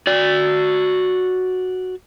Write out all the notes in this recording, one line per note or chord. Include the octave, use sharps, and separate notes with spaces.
F#4 D5